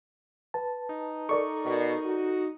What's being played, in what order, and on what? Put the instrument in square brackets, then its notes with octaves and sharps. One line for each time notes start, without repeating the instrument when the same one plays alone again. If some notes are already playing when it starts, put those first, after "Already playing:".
[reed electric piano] B4 A5
[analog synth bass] D#4
[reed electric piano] A4 [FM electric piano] A#4 D5 C#6
[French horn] B2
F#4